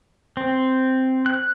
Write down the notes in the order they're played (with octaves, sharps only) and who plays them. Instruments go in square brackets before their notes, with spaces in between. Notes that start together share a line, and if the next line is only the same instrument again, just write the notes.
[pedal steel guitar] C4
F#6